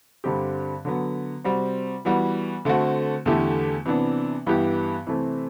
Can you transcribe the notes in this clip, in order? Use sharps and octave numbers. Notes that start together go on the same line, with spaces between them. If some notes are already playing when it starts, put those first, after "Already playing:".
G2 D3 G3 C4 G4
D3 F#3 B3
C3 G3 C4 F#4
E3 G3 B3 F#4
D3 A3 C4 F#4
E2 D3 A3 E4 G4
C3 E3 B3 D4
G2 E3 B3 E4 G4
C3 E3 A3 C4 E4